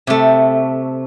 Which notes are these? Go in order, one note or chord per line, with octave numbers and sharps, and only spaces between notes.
C3 A3